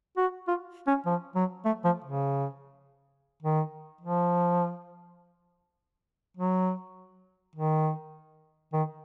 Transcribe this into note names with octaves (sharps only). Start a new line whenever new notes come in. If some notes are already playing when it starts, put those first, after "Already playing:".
F#4
F4
C#4
F3
F#3
A3
F3
C#3
D#3
F3
F#3
D#3
D#3